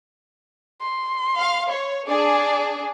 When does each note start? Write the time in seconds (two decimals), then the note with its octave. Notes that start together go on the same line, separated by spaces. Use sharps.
0.82 C6
1.38 F5
1.72 C#5
2.08 D4 G#4 D5